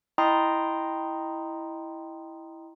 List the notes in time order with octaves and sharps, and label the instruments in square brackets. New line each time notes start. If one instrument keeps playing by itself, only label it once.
[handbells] E4 D#5 G5 A#5 C6 D#6